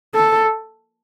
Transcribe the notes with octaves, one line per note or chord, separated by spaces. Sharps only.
A4